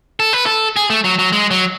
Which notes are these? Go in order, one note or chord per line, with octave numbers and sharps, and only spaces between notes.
A4
B4
A4
G#4
A3
F#3
F#3
G#3
F#3